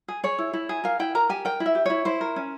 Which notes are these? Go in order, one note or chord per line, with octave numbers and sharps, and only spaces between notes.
G#4
G#4 C#5
E4
E4
G#4
A#4 F5
E4 G5
A#4 A#5
G4 G#5
A#4 G5
E4
E5
G4
E4 C#5
E4 C5
A#4
C#4